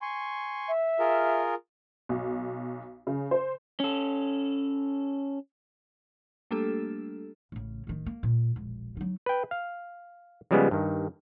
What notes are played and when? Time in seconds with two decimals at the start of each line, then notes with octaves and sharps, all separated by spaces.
0.02 G#5 C6 C#6
0.68 E5
0.99 F4 G#4 A#4
2.09 B1
3.07 C#3
3.31 C5
3.80 C#4 A4
6.51 G3 A3 A#3 D4 G4 A4
7.52 A1 C#3
7.87 D1 D#3
8.06 A#3
8.23 A#2
8.56 E1 A#1
8.97 F#3 D#4
9.26 B4 G5
9.51 F5
10.51 C#3 F3 G3 G#3 B3 C#4
10.71 G2 D#3